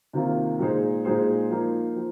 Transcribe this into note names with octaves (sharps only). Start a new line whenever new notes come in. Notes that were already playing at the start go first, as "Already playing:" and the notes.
C3 D#3 A#3 F4
A#2 G#3 D#4 G#4 C5
A#2 G#3 D#4 G#4 C5
F3 A#3 D#4
F3